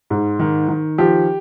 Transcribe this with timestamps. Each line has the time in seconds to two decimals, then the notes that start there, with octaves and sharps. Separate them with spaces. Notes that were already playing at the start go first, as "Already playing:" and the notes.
0.10 G#2
0.39 D#3
0.69 D#3
0.98 F3 G4